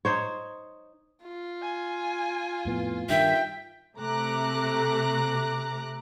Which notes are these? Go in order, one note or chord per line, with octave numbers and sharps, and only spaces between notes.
D#4 C5 C#5
F4
G#5
F2 A2 B3
G2 D#3 E5 G5
C3 A3 A#5 D6 F#6